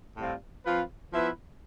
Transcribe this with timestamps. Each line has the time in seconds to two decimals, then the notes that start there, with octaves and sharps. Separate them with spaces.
0.16 A2 G3 C4 F4
0.64 F3 C4 F4 B4 F5
1.12 F3 B3 E4 B4 E5